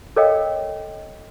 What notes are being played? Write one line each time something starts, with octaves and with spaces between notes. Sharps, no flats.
A4 A#4 C#5 D#5 F5 G5